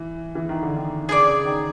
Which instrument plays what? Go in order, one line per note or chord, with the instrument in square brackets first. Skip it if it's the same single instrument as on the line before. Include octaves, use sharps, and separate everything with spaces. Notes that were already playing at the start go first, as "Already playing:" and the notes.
Already playing: [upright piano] E3
E3
D#3
D3
D#3
[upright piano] C#3 [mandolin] G#4 B4 D5
[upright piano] C#3
D#3